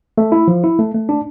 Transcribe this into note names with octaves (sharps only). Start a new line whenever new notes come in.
A3
E4
F3
E4
A3
A3
D4